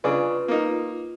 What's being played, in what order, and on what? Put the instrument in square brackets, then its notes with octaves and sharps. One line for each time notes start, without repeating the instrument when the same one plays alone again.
[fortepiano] C#3 D4 G#4 [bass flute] F4 [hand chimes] B4
[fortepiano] A#3 D#4